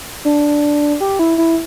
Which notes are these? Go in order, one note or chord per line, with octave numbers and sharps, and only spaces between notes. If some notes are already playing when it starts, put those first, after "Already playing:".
D4
G4
E4
E4